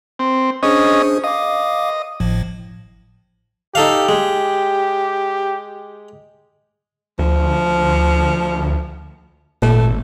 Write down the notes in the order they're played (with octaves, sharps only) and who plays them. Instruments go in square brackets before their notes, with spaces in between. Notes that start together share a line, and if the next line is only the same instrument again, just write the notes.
[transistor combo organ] C4
[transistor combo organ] C#4 D#5 [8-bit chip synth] D4 G#4 C5
[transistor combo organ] D#5 [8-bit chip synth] F5 D6
[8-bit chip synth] G#1 A2 F3
[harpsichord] D#4 A4 F5 [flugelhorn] G4
[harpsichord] G#3
[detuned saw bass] D2 [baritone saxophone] F3
[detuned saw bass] G#1 [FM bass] A#2 [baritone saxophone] A3